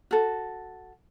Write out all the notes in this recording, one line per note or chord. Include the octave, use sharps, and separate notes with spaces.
F#4 A4